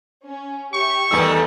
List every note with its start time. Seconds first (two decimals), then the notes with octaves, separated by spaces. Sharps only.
0.24 C#4
0.73 G4 E5 C#6
1.11 E2 D#3 G3 A3 E4 B4 D#5 E6